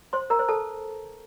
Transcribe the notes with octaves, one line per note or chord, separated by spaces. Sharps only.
C5 C6
A#4 A#5
C5
A4 A5